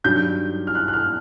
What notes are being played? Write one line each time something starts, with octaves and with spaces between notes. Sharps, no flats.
G2 D#3 F#3 G6
F6
F#6
F#6
F6